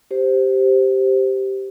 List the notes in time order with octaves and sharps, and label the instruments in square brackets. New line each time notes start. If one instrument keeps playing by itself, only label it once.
[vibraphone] G4 C5